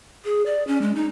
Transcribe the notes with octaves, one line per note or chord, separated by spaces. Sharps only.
G#4
D5
C#4
G#3
D#4